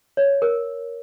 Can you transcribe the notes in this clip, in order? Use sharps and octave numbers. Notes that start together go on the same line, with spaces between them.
C#5
A#4